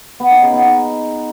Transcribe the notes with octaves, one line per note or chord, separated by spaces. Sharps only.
B3
D#4
C#3
B3
D#4